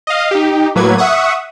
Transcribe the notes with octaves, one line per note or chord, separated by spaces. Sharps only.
D#5 F5
D#4 G4
A2 F#3 A#3 B4 G#6
E5 F#5 C#6 D#6